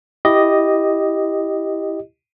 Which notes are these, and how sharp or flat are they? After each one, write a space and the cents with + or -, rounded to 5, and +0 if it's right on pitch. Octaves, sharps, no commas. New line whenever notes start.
E4 +0 G4 +0 D#5 +0